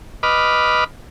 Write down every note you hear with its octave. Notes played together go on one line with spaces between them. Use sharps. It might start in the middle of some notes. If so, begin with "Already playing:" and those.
B4 D#5 B5 D6 F6